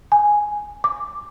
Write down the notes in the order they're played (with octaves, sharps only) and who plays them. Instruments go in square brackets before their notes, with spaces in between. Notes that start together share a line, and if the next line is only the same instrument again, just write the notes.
[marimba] G#5
D6